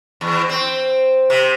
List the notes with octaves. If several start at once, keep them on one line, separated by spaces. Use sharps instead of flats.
E2
C4
C3